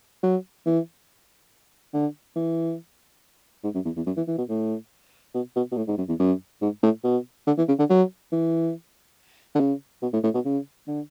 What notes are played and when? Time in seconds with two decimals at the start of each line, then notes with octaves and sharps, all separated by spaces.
0.23 F#3
0.66 E3
1.94 D3
2.36 E3
3.64 G#2
3.74 F#2
3.85 E2
3.96 E2
4.06 F#2
4.17 E3
4.28 E3
4.38 B2
4.49 A2
5.34 B2
5.56 B2
5.72 B2
5.77 A2
5.88 G#2
5.98 F#2
6.08 E2
6.19 F#2
6.62 G#2
6.83 A2
7.04 B2
7.47 D3
7.58 E3
7.68 C#3
7.79 D3
7.90 F#3
8.32 E3
9.55 D3
9.60 C#3
10.02 B2
10.14 A2
10.24 A2
10.34 B2
10.45 C#3
10.87 D3